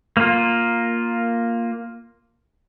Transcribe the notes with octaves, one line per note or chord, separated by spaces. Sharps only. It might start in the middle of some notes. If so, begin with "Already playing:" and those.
A#3 F4